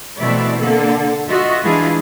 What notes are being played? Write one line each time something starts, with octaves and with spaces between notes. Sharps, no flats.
B2 E3 A3 C4 D5 E5
D3 A#3 A4
F4 F#4 D#5 E5
E3 G#3 D4 E4 F4 G#4